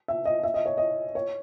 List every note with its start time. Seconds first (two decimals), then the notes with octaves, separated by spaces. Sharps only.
0.08 E5
0.25 D#5
0.44 E5
0.54 D#5
0.66 C#5
0.78 D#5
1.15 C#5